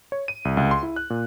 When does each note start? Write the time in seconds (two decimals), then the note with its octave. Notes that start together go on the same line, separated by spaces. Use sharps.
0.12 C#5
0.28 D#7
0.45 C2
0.57 C#2
0.71 C6
0.83 E4
0.96 F#6
1.10 A#2